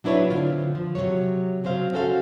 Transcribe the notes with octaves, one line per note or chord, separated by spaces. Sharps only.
F#3 D4 E4 B4 C#5
D3 C4 F4
F3
C3 D#3 F#3 C#5
C#3 F#3 C4 C5 F5
C#4 F#4 A4 C5 F5